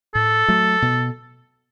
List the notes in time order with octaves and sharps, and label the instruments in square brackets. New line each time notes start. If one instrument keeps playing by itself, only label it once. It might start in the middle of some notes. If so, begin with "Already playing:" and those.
[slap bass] A2 [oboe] A4
[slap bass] F#3 A3
B2